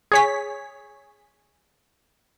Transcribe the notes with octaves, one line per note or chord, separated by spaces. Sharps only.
G#4 C#5 B6